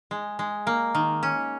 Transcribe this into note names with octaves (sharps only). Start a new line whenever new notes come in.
G#3
G#3
A#3
D#3
C#4